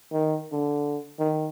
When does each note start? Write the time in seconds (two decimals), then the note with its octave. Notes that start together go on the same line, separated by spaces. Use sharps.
0.12 D#3
0.52 D3
1.19 D#3